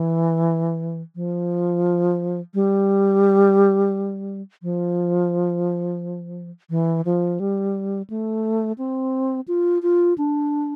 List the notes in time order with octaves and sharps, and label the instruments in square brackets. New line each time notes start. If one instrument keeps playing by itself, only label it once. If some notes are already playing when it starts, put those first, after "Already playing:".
Already playing: [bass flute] E3
F3
G3
F3
E3
F3
G3
A3
C4
F4
F4
D4